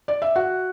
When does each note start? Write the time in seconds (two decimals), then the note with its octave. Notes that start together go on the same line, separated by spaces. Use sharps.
0.08 D5
0.22 E5
0.36 F#4 F#5